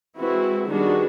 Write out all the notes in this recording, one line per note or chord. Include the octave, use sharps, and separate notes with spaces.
E3 G#3 C4 E4 F#4
D#3 G3 B3 D4 F#4 G#4